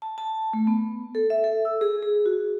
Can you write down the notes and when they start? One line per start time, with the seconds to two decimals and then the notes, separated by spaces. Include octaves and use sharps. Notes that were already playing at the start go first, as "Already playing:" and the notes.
0.02 A5
0.18 A5
0.53 A3
0.67 B3
1.15 A4
1.30 E5
1.44 A4
1.65 E6
1.81 G#4
2.03 G#4
2.26 F#4